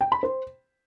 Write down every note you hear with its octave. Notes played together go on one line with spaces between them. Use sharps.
G5
B5
C5